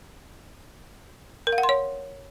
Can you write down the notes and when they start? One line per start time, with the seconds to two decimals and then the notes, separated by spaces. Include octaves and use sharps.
1.47 A#4
1.52 F5
1.58 F#5
1.63 C6
1.69 C#5